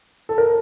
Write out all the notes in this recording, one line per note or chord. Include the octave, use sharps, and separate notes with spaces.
A4
A#4